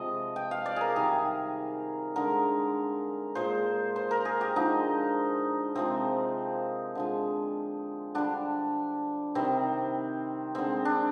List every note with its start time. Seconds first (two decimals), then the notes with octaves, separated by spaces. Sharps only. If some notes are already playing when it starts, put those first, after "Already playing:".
Already playing: C3 F3 G#3 D#5
0.36 G5
0.51 F5
0.66 D5
0.76 G#4 A#4
0.96 C3 D#3 G3 G#4
2.16 D3 G#3 A#4
3.35 A#2 G#3 C5
3.96 C5
4.11 A#4
4.25 G#4
4.41 G4
4.56 D3 F3 G#3 D#4
5.75 C3 F3 G#3 C4
6.95 D3 F3 G#3
8.15 D3 G3 D4
9.35 C3 D#3 G3 C4
10.55 D3 G#3 C4
10.85 D4